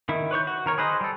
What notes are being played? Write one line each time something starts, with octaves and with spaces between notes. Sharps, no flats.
D#3 E4
B4 C#5 C#6 G6
F#4
D#3 A#4 C#5
G#4 B4 C5 D#5
G3 A4